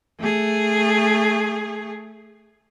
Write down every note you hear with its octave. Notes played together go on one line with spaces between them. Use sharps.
A3 G#4